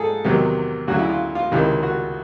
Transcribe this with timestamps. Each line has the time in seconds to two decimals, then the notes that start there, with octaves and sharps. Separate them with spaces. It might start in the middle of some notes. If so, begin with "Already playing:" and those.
Already playing: G#2 F3 G#4 A4
0.24 E2 C3 D#3 F#3
0.87 D2 C#3 F#3 F#4
0.99 E4
1.09 F4
1.35 F4
1.51 C#2 C3 D#3 E4
1.83 F#4